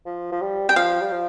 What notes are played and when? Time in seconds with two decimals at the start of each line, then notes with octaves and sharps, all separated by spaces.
0.05 F3
0.32 F3
0.41 G3
0.69 G3 G5
0.76 F3 F5
1.01 G3
1.12 F3